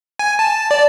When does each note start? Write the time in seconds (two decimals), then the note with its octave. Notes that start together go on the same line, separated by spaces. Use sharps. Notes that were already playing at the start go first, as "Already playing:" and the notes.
0.19 G#5
0.39 A5
0.71 D5